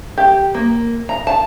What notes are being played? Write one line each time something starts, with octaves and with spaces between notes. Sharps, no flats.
G4
A#3
A#5
A5